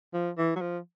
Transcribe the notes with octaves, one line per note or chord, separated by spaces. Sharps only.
F3
E3
F#3
F3